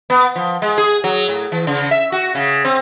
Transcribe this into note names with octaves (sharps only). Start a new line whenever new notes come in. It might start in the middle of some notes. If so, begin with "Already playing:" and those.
B3
F3
G#3
G#4
F#3
A2
E3
C#3
E5
F#4
C#3
C4